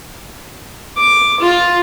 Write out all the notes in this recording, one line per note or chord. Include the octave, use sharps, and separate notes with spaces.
D6
F4